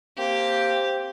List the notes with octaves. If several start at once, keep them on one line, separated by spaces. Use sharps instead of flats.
A#3 C4 G4 G5